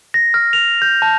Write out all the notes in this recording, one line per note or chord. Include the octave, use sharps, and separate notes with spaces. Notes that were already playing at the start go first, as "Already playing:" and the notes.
A#6
F6
F7
G6
A5